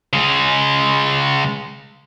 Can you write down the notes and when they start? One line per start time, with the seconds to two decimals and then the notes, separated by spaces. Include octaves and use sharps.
0.13 C#3 G#3